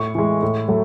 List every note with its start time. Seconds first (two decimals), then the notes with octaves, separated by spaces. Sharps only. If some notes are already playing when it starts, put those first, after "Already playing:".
Already playing: A2 C#6
0.15 E3 G#3
0.43 A2
0.68 F#3 A3